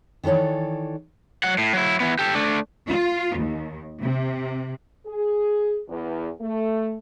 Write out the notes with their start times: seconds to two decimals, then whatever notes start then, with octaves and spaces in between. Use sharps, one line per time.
0.23 D#3 E3 A4 C#5 D5
1.44 F#3 F#5
1.58 A2
1.73 F#3 E4
2.00 E3 B3
2.19 G4 A4
2.35 A3 D4
2.88 F4
3.36 D#2
4.01 C3
5.06 G#4
5.88 E2
6.41 A3